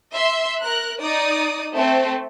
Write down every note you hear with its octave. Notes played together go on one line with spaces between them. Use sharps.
E5 C6
A#4 F#6
D#4 D5 D#6
A3 C4